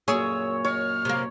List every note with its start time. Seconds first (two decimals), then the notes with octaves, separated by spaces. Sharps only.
0.08 F#2 A#2 G#4 C#5 E6
0.65 C#5 D#5 F6
1.05 C3 A#3